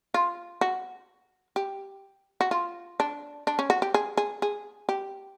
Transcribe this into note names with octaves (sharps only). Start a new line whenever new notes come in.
F4
F#4
G4
F#4
F4
D4
D4
C#4
F#4
G4
G#4
G#4
G#4
G4